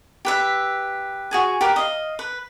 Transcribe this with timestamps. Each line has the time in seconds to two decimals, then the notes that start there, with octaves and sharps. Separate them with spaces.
0.25 G4 B4 E5
1.31 F#4 G#4 G#5
1.61 G4 A#4 B4
1.76 D#5 F5
2.19 B4